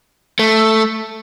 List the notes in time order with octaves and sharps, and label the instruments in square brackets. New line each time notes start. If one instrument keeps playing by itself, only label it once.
[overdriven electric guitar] A3